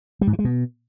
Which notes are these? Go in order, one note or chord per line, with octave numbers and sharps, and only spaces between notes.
G3
G#2
E3
G#3
B2